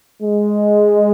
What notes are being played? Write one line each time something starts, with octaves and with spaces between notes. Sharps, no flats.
G#3